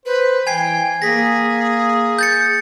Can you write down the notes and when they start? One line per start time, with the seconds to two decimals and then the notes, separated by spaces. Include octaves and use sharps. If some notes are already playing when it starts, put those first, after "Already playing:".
0.06 B4 C5
0.47 E3 G5 G#5 G#6 C7
1.02 A#3 G#4 A#6 B6
2.19 G6 A6 C#7